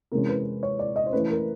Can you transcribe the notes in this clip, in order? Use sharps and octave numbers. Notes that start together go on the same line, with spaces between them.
C3 E3 G#3 C#4 A#4
B4
C#5
D5
D#5
C5
E3 A3 C#4 B4
A#4